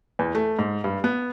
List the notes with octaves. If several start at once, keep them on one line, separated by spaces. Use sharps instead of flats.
E2
A3
G#2
G2
B3